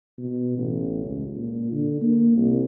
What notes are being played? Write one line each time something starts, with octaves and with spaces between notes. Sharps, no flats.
B2
A1
C#2
A#2
D3
A#3
C2